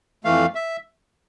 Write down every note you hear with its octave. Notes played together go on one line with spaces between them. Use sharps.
F2 E3 A3 F5
E5